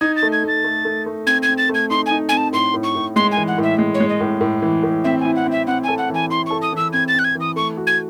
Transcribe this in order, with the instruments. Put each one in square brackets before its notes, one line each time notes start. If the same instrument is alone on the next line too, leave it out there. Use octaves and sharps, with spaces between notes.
[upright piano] D#4 [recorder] G#6
[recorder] A6
[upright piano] A3
[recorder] G#6
[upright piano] A3 [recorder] A6
[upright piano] A3
A3
A3
[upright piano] C4 [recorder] G#6
[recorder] G#6
[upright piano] C4
[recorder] A6
[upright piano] A3
[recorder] G#6
[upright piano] D#4 [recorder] C6
[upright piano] D#4 [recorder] G#5
[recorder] G#5
[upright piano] C4
[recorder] A5
[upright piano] A2 [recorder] C6
[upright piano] A2
[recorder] C#6
[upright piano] A2
[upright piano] G#3 [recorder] C6
[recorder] G#5
[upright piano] E3
[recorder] F#5
[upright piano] A2
[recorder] E5
[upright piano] G#3
[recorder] C#5
[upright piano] G#3
[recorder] D#5
[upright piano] A2
A2
E3
A2
[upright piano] C4 [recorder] E5
[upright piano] E4 [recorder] G#5
[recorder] F#5
[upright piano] C4
[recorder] E5
[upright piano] C4 [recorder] F#5
[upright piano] A4 [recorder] G#5
[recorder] F#5
[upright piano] E3 [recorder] G#5
[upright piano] E4 [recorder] C6
[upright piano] A4 [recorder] C#6
[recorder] D#6
[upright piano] E3 [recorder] E6
[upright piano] C4 [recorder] G#6
[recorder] A6
[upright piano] C4 [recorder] F#6
[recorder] G#6
[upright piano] E3
[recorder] D#6
[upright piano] A3 [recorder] C#6
[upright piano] F#4
[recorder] G#6